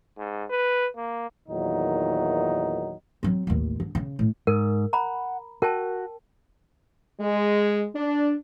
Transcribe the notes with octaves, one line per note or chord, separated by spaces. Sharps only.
G#2
B4
A#3
E2 A#2 D#3 F#3 D#4
F#3 C4
A1 D#2
D3
C#3
A2
G#2 A#4
F#5 A#5 B5
F#4 A#4 G5 A5
G#3
D4